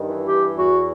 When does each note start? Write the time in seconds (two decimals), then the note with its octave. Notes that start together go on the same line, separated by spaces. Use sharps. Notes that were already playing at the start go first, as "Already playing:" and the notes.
Already playing: G2 D#3
0.09 E3
0.25 G4
0.56 E2 F#4